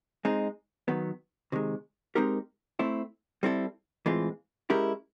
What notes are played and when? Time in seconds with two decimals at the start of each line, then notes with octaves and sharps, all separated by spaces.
0.25 G#3 C4 D#4
0.88 D#3 F#3 B3
1.52 C3 D#3 G#3
2.15 G#3 C4 D#4 G4 A#4
2.79 A3 C4 E4
3.43 G3 C4 E4 A4
4.06 A2 E3 G#3 C4 F4
4.70 G#3 C#4 E4 G4 A#4